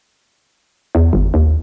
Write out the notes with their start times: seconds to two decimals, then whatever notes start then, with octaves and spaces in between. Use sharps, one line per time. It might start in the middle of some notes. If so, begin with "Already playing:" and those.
0.95 E2
1.13 G1
1.34 D#2